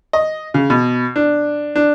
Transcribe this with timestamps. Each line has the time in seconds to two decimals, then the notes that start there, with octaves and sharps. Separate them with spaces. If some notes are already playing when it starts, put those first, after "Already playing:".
0.13 D#5
0.54 C#3
0.70 B2
1.16 D4
1.76 D4